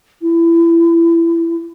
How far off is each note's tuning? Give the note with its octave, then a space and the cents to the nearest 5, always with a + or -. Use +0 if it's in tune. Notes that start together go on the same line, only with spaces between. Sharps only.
E4 +25